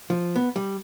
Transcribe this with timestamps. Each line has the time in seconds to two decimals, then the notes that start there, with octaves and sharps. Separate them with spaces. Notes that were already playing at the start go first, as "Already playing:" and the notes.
0.10 F3
0.36 B3
0.56 G3